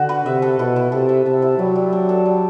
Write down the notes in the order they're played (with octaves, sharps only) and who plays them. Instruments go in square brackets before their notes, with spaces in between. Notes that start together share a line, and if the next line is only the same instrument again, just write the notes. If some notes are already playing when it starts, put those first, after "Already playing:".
Already playing: [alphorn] D3 [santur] F#4
[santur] B4
[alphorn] C3 [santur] E5
[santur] A4
[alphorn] B2 [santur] E4
[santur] E4
[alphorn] C3 [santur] A4
[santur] E5
[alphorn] C3 [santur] A4
[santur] E4
[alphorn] F#3 [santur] G3
[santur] G3
D4
A4
G3